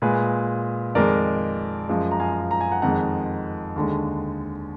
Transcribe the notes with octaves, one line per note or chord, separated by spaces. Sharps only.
A#2 G#3 G#4 B4
F2 D#3 G#3 A#4 D5
F#2 F3 G#3
A#5
F5 G#5
A#5
G#5
F#5 A#5
F2 D#3 G#3 F#5 A#5
D#2 D3 G#3